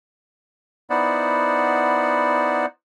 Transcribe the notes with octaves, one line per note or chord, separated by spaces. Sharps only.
B3 D#4 E4 C5 D5 F#5